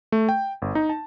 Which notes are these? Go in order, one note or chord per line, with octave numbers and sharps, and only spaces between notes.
A3
G5
G1
D#4
A5